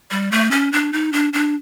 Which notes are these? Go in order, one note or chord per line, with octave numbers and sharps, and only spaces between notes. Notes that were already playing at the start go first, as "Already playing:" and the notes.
G3
A3
C#4
D4
D#4
D4
D4